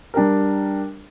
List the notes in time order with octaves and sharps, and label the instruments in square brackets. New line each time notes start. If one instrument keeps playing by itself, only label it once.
[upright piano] G3 D4 G4 A#4